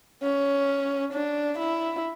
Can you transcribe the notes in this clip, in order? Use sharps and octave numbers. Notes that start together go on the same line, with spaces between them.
C#4
D4
E4